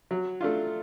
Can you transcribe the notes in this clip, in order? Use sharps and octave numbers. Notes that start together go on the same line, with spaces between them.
F#3
A3 D4 F4